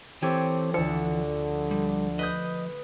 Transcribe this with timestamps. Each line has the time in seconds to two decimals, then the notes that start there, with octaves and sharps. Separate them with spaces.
0.22 E3 C4 G4 A4 C#5
0.74 D2 D3 F3 A4 C#7
1.71 G3
2.19 B4 D#5 D#6 G6